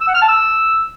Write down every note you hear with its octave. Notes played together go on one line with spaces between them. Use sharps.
E6
F#5
F6
A5
E6